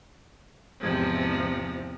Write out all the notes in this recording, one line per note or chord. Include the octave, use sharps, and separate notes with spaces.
E2 G#2 C3 F3